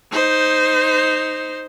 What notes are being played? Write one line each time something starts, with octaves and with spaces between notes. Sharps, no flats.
D#4 C5